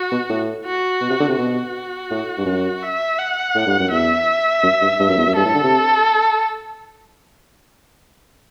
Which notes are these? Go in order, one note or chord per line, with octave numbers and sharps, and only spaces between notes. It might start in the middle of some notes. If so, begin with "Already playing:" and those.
Already playing: F#4
B2
A2
F#4
B2
C3
D3
C3
B2 F#4
A2
G2
F#2
E5
F#5
A2
G2
F#2
E2 E5
F#2
G2
G2
F#2
E2
F#2
G2 A4
A2
D3
C3